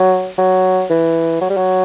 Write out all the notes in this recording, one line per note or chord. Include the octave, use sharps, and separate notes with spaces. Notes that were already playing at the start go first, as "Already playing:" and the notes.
Already playing: F#3
F#3
E3
F#3
G3
F#3